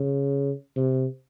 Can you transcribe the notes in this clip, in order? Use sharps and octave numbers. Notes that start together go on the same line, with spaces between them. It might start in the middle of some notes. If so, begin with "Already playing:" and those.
Already playing: C#3
C3